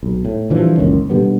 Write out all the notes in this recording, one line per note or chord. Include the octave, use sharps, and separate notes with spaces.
B1
A2
D3 E3 F3 G3
F#1 C#2 D#3 C#4
B2 D3 G3 B3